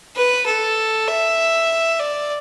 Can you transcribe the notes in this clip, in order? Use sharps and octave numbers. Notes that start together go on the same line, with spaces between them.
B4
A4
E5
D5